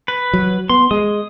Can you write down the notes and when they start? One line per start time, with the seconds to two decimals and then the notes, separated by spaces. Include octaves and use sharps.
0.08 B4
0.33 F#3
0.69 B3 C6
0.91 G#3 D#6